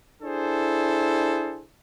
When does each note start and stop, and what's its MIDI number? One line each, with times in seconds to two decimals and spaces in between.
0.23 1.63 62
0.23 1.63 64
0.23 1.63 68
0.23 1.63 69
0.23 1.63 72